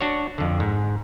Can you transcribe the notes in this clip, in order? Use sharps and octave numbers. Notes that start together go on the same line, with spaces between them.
D4 F#4 C#5
F2 D3
G#2